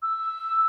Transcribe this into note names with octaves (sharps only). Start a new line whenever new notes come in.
E6